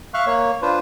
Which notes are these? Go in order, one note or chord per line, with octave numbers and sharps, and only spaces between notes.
E5 F5 C#6 F6 F#6
A#3 C#5
D4 F4 B4 C5